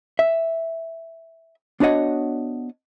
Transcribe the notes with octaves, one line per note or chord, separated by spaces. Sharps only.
E5
B3 D4 F#4 C#5 D#5 F#5